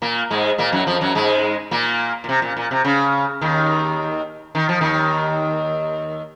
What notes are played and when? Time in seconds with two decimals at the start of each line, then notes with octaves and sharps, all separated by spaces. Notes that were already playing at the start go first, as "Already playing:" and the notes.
0.02 A#2 A#3
0.31 G#2 G#3
0.58 A#2 A#3
0.72 F#2 F#3
0.87 F2 F3
1.01 F#2 F#3
1.15 G#2 G#3
1.71 A#2 A#3
2.24 A#2
2.29 C3
2.42 A#2
2.57 A#2
2.71 C3
2.84 C#3
3.41 D#2 D#3
4.55 D#3
4.69 F3
4.81 D#2 D#3